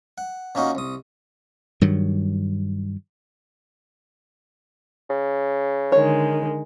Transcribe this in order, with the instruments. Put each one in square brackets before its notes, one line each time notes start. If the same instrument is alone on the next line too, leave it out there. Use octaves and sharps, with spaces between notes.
[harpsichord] F#5
A#2 A#3 C#4 D#4 F#4
C2 D#6
[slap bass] G2 D#3 F#3
[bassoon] C#3
[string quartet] D3 D#3 G#3 [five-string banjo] C#5